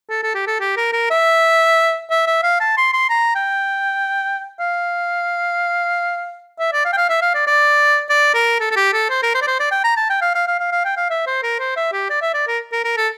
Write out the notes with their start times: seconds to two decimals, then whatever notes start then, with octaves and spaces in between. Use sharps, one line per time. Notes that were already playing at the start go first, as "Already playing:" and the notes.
0.10 A4
0.23 A4
0.35 G4
0.47 A4
0.61 G4
0.77 A#4
0.93 A#4
1.11 E5
2.10 E5
2.27 E5
2.43 F5
2.60 A5
2.77 C6
2.93 C6
3.10 A#5
3.36 G5
4.60 F5
6.60 E5
6.73 D5
6.85 F5
6.93 G5
6.97 F5
7.10 E5
7.22 F5
7.35 D5
7.47 D5
8.10 D5
8.34 A#4
8.60 A4
8.71 A4
8.76 G4
8.93 A4
9.10 C5
9.23 A#4
9.35 C5
9.42 D5
9.48 C5
9.60 D5
9.72 G5
9.84 A#5
9.97 A5
10.10 G5
10.22 F5
10.35 F5
10.48 F5
10.60 F5
10.72 F5
10.85 G5
10.97 F5
11.10 E5
11.27 C5
11.43 A#4
11.59 C5
11.77 E5
11.93 G4
12.10 D5
12.22 E5
12.34 D5
12.48 A#4
12.72 A#4
12.84 A#4
12.97 A4